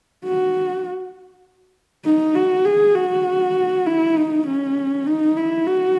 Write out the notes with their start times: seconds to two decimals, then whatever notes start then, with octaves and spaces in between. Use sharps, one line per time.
0.25 F#4
2.05 D#4
2.35 F#4
2.65 G#4
2.95 F#4
3.86 E4
4.16 D#4
4.47 C#4
5.06 D#4
5.37 E4
5.67 F#4